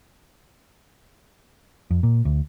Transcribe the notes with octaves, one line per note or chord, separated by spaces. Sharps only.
F2
A#2
D2